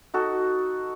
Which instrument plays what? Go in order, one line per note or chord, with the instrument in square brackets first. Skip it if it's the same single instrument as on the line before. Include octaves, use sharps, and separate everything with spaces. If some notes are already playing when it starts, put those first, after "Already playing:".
[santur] D#4 F#4 A4